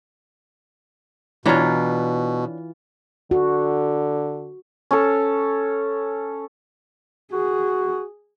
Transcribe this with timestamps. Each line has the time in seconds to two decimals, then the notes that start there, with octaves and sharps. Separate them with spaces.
1.46 B2 E3 D4 F4 C#5 A#5
3.31 D3 F#4
4.91 C#4 A4
7.32 F#4 G#4